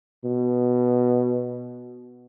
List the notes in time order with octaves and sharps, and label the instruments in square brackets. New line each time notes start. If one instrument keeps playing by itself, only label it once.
[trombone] B2